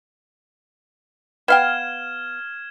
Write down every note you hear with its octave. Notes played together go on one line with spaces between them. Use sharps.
B3 F5 G5 F6 G#6 E7